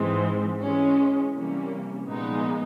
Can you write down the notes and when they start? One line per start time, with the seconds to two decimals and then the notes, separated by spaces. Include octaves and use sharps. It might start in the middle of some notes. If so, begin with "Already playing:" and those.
Already playing: G#2 E3 G#3 C4
0.61 E3 G#3 C#4
1.33 C3 E3 G3 A#3 C#4
2.07 A#2 F3 G#3 B3 D#4